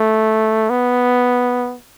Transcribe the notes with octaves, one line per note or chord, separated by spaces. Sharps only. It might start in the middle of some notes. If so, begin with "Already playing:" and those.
Already playing: A3
B3